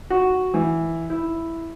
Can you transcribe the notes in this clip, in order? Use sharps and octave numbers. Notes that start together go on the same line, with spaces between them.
F#4
E3
E4